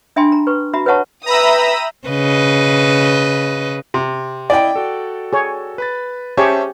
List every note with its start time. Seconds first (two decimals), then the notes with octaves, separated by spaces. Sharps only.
0.16 D4 E5 G5 G#5 B5 C6
0.32 A#5
0.47 B4 C#6
0.73 F#4 E5 A#5 B5
0.86 B4 C#5 E5 F#5 A5 C#6
1.26 B4 E5 G5 A#5 B5 D#6 E6
2.07 C#3 B4 D#5
3.94 C3
4.50 E4 D5 D#5 G5
4.76 F#4 A4
5.33 G#4 C#5
5.78 B4 B5 A6
6.37 C#4 G4 G#4 C5 C#5 E5 A5